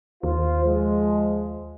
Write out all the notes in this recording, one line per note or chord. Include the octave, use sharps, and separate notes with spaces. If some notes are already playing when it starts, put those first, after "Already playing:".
D#2 F4 C5
F3 G#3